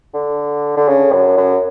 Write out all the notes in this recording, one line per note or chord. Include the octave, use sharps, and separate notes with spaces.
D3
D3
C#3
F#2
F#2